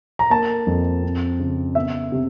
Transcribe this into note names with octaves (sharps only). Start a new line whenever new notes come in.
A#5
A#3 A5
F2
C4
C#3
B3 E5
C3